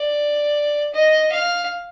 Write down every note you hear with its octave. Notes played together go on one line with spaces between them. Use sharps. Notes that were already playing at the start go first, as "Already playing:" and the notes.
Already playing: D5
D#5
F5